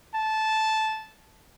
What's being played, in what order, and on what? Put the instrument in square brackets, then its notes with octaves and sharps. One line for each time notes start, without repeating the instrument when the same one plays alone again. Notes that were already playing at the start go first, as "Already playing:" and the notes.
[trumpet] A5